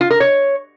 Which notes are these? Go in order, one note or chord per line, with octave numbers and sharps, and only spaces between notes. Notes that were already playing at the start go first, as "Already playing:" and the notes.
F4
A#4
C#5